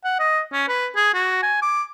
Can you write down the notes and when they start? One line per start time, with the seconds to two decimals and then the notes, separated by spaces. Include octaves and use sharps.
0.04 F#5
0.19 D#5
0.53 C#4
0.68 B4
0.96 G#4
1.14 F#4
1.43 G#5
1.62 D6